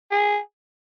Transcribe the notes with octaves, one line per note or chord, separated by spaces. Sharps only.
G#4